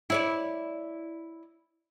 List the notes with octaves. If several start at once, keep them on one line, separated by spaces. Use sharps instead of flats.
E4 C#5 D5